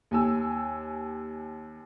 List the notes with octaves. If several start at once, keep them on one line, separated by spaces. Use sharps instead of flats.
D#2 G#5 E6